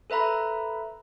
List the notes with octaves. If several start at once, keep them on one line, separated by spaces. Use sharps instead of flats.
A4 B4 E5 A#5 B5